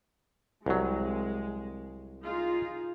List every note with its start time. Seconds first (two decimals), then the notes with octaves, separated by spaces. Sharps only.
0.66 C2 F#3 G#3
2.23 D#4 F4 G#4